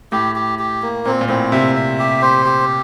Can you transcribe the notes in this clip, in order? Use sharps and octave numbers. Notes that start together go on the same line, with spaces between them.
A2 G4
G4
G4
A#3
A#2 C4
A#2
A2 C4
C3 E5
E5
G4
C5
G4